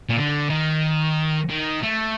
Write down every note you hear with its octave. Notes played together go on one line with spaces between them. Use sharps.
A#2
D3
D#3
D#3
A3